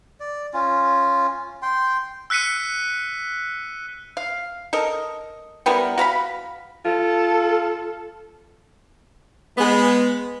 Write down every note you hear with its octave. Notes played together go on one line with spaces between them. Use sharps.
D5
C#4 F4
G5 C6
E6 F#6 B6 C#7 D#7
F5
A4 A#4 D#5
G3 B3 E4 A#4
F#4 F5 A#5 B5
F4 A4
G#3 B3